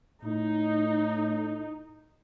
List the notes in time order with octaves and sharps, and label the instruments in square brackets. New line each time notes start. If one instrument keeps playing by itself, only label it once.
[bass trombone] A2 [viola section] D#4